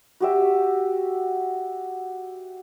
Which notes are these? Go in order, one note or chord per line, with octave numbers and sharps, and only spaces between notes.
F#4 G4 E5